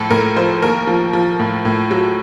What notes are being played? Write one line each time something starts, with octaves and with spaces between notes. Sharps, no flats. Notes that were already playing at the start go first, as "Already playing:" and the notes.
Already playing: A2 F3 A4
A2 A#4
F3 C5
D#2 A#4
F3
F3
A2
A2
F#3